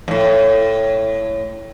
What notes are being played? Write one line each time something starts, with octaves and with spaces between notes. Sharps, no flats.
F2 A2